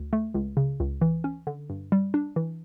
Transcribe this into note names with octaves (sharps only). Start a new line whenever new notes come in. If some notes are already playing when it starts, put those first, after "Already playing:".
Already playing: D2
A3
C#2
C#3
C#2
E3
C#4
D3
G2
G3
D4
E3